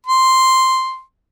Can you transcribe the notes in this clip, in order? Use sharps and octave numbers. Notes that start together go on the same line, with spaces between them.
C6